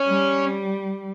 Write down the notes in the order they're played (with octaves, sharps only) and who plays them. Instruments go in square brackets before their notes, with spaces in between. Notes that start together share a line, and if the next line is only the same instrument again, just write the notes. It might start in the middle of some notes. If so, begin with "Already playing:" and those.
Already playing: [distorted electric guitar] C#4
[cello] G3